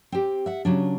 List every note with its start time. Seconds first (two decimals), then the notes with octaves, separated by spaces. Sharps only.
0.12 C4 G4
0.46 E5 F#5
0.65 C#3 F#3 D4